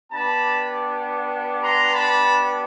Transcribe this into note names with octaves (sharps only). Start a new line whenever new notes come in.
B3 D4 G4 A5 B5
A#5 C6
A5 B5